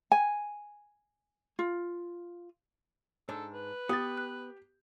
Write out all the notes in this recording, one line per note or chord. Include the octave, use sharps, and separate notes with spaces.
G#5
F4
G#2 D4 A4
B4
B3 G4 D#6 A6
F#6